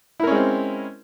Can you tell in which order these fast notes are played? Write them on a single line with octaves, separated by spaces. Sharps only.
E4 A#4 C#4 G#3 C4